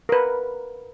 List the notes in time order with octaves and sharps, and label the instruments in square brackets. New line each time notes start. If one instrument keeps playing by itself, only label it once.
[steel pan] A#4 B4